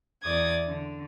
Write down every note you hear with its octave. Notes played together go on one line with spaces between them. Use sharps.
E2 D5 D#6 G#6
D3